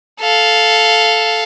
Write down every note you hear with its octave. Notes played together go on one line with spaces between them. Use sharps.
A4 F5